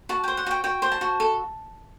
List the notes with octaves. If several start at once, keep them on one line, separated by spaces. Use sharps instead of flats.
F#4 A5
C5 G5
F#5
F#4 G5
F#4 G5
C5
A5
F#4
A4